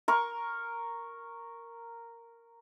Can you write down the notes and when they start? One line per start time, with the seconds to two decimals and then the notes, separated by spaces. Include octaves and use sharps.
0.08 A#4 C#6